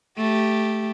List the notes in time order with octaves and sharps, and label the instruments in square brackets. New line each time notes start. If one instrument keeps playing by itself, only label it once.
[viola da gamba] A3 G4